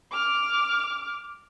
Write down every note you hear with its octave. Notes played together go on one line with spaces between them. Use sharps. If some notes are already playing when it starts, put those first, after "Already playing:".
D6 F6